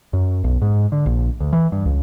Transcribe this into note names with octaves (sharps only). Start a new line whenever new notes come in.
F#2
B1
G#2
D3
A#1
D2
E3
G2
C#2